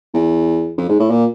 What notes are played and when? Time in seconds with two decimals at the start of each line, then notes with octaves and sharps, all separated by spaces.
0.14 E2
0.78 F2
0.89 G#2
0.99 A2
1.10 A#2